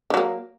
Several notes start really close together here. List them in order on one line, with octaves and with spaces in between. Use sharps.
D#3 F#3 A#3